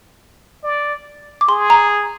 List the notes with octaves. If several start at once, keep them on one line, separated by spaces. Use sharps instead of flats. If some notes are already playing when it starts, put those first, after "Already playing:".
D5
D6
G#4 C6
A#5